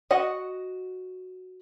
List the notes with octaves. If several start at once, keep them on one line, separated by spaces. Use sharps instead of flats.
F#4 D#5 F#5